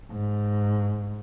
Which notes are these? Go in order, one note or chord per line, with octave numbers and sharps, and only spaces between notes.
G#2